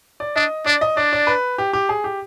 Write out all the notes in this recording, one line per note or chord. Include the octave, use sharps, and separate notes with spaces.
D5
D4 D#5
D4 D5
D#5
D4 D5
D5
B4
G4
G4
G#4
G4